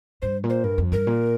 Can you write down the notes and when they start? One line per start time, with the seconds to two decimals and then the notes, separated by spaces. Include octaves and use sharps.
0.22 G2 C5
0.44 A#2
0.50 C5
0.64 G2 A#4
0.78 F2
0.92 G2 A#4
1.07 A#2